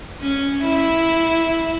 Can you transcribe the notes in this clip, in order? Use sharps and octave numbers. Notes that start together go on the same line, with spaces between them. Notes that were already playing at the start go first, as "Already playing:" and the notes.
C#4
E4